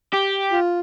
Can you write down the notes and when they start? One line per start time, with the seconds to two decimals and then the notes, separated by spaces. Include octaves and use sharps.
0.14 G4
0.52 F4